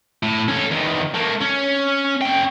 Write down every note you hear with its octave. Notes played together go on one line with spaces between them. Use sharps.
A2
C#4 A4
E2 D#3
A3 A#3
C#4
C#4 G5